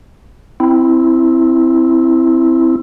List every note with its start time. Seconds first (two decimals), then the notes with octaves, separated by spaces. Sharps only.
0.60 C4 E4